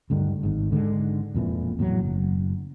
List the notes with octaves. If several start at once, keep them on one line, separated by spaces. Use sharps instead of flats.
D2 G2 D3 D#3
G#1 G#2
G#2 D3 G3 G#3
E1 F2 A#2 E3
E2 A2 F3 F#3
F#1